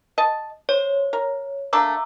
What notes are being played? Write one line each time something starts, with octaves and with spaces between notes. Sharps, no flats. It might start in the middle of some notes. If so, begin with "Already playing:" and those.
D#5 A5
C5 C#5
A#4
A3 A#3 D4 A#5 D6 E6